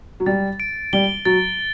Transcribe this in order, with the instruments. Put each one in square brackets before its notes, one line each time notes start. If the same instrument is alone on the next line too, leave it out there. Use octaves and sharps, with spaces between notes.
[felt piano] F#3
[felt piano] G3 [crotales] A6
[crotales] D7
[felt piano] G3 [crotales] G7
[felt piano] F#3 [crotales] A6